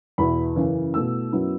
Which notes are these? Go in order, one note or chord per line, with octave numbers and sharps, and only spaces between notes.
E2 B2 B3 E4 B5
F#2 C#3 E3
B2 A3 E4 E6
F#2 F#3 B3 E4